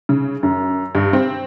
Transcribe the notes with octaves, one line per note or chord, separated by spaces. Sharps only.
C#3
F#2
G2
C4